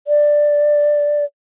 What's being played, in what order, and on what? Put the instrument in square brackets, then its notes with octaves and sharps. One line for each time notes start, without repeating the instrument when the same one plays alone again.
[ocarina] D5